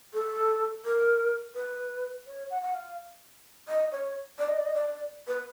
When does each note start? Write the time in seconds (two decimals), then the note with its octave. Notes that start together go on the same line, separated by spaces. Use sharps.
0.14 A4
0.85 A#4
1.55 B4
2.27 C#5
2.50 F#5
2.62 F#5
2.74 F5
3.68 D#5
3.92 C#5
4.39 D5
4.49 D#5
4.57 D5
4.65 D#5
4.74 D5
5.28 B4